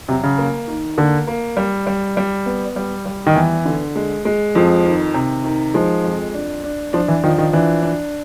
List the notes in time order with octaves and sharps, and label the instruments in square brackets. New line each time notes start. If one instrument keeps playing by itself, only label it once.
[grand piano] C3 [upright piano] F#3
[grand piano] C#3
[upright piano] A#3
D#3
[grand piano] D3 [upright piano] A#3
[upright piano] A#3
G3
G3
G3
B3
G3
G3
[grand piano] D#3
[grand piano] E3 [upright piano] B3
[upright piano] D3
G#3
G#3
[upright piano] F2 [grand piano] F3
[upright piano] D#3
C3
D#3
[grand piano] F3 [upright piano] G#3
[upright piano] F2
D4
D4
[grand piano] F3 [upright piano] D4
[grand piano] E3
[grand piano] D#3 [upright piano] F3
[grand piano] D#3
[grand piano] E3 [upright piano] D4
[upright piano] D4